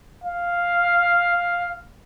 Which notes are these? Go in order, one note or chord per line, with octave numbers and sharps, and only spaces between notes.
F5